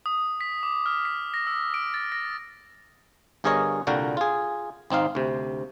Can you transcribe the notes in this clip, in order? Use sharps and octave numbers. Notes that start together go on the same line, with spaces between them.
D#6
B6
D6
F6
B6
A#6
E6
D7
A6
A#6
G1 G2 G#4 A#4 C#5 D#5
C2 A#2 D3 F#4 A#4 G5
F4 G#4
G#1 C4 D#4 F5
D2 C3